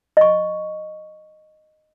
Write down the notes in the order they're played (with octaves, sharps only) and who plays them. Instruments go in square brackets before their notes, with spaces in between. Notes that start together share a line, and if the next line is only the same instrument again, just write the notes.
[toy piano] D#5 C#6